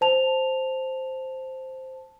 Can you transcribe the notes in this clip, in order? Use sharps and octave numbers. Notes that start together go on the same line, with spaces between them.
C5 A5 F7